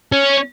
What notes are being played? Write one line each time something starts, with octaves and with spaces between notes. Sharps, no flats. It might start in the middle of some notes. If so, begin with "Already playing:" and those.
C#4